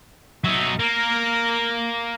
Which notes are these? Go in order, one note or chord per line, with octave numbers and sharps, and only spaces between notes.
F#3 D#4 E5
A#3 A#4